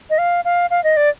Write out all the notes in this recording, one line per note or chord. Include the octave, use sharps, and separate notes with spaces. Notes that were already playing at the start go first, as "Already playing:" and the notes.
D#5
F5
F5
F5
D#5
D5